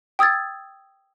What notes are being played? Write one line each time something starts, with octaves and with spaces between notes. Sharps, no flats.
G5 D#6 E6 G#6 A6